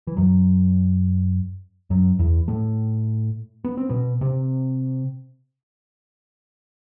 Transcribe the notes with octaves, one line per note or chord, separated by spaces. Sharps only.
E3
F#2 F#3
F#2 F#3
E2 E3
A2 A3
B3
C4
B2 B3
C3 C4